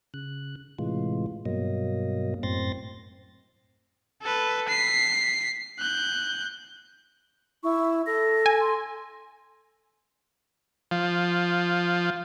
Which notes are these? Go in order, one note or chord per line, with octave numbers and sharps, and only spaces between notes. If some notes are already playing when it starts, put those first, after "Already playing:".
C#3 F#6
A2 C3 E3 G#3 F4
G2 B2 F#3 A#3 D#5
F#2 A2 C4 C6 A6 A#6
A4 B4
B6 C7
F#6 G6
E4 C#6
A4 A#6
G#5
C6
F3